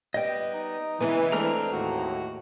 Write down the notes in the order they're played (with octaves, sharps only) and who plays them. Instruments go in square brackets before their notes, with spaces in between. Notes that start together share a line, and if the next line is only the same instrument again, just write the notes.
[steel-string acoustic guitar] G3 B3 [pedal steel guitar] D#5 G5
[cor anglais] D#4
[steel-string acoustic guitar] C#3 G#3 B3 [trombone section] E3
[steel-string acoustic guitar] G#3 A3 C4 [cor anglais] D4 [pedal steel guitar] A#5 F6
[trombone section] D#2 A2 [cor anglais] F#4